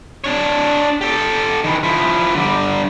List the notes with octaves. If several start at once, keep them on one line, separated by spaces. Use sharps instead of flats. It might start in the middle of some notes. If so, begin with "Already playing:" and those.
D4 C#5
G4 A4
D#3 E3
F3 E4
D3 G3